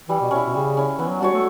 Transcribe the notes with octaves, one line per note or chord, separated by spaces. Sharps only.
E3 G3
B2
B2 C#4 E4
B2
C#3 G3
C#4 E4
E3 B3
F#3
G3 D4 F#4 C#5
A3